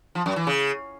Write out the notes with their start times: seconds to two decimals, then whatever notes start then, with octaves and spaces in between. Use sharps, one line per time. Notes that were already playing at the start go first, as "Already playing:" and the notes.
0.15 F3
0.26 F#2
0.36 E3
0.47 C#3